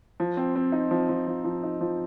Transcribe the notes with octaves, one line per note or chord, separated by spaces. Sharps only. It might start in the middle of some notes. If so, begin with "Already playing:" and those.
F3
C4
C4
D#4
F3
F3
F3
F3
D#4
F3